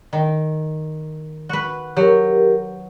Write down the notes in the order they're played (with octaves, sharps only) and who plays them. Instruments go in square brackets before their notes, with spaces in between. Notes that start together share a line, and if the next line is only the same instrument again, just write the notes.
[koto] D#3
F#4 B4
[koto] F#3 [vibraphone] G4 A#4